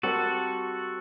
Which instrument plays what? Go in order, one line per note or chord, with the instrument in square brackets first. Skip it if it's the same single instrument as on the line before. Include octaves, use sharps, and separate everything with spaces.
[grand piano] G3 C4 G4 A#4 [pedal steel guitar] F#4 A4